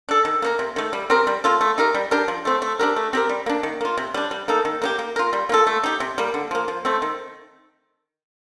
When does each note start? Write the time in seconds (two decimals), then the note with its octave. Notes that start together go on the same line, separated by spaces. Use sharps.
0.09 D4 A4
0.25 D#3
0.42 A#3 D#4 A#4
0.59 C3
0.76 D#3 A3
0.93 G3
1.10 C4 G4 A#4
1.27 G3
1.44 A#3 F4 A4
1.61 A3
1.78 D#4 G4 A#4
1.94 G3
2.11 D4 G4 A#4
2.28 F3
2.45 A3 C4
2.62 A3
2.79 D4 G4 A#4
2.96 A3
3.13 C4 G4 A#4
3.29 G3
3.46 A#3 D4
3.63 D#3
3.81 A#3 F4
3.97 C3
4.14 G3 D4
4.31 G3
4.48 A#3 D#4 A4
4.65 D#3
4.82 A#3 D#4 G4
4.99 A#3
5.16 F4 A#4
5.33 G3
5.49 A#3 F4 A4
5.67 A3
5.83 D#4 G4
6.00 C3
6.18 G3 A#3
6.34 D3
6.51 F3 A#3
6.68 F3
6.85 A3 C4
7.02 D#3